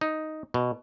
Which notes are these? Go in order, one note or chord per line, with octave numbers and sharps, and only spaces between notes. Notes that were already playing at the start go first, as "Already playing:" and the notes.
D#4
B2